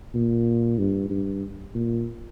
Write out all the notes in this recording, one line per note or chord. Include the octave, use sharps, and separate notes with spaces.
A#2
G2
G2
A#2